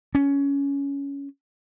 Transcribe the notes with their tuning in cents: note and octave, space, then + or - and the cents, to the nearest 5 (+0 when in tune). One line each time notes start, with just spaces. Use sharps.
C#4 +15